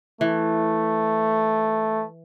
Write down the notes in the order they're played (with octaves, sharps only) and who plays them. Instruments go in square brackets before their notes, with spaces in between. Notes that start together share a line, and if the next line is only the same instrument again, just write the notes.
[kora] E3 [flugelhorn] A3